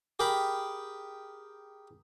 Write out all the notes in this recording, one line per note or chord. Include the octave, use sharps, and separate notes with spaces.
G4 G#4 A#4 G5 B5